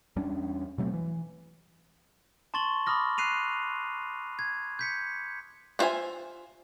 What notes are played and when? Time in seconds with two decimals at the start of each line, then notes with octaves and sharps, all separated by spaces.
0.16 E2 G3 C#4 D4
0.78 B2 F#3 A3 C4
0.93 E3
2.54 A5 C6 C#6 A6 F#7 G7
2.86 B5 D6 D#6 F6 A#6
3.18 F#6 C7 D#7 F7
4.39 G#6
4.79 G6 B6 C#7
5.79 B3 F4 C5 E5 G#5